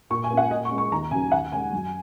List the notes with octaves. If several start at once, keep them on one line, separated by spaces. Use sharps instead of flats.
A#2 C#6
G#5
A#3 C#4
F#5
A#2 D#5
C#6
G#3 C#4
C#6
D#2 A#5
C#3 F#3 C#4 G#5
D#2 F#5
C#3 G#3 C#4 G#5
F#2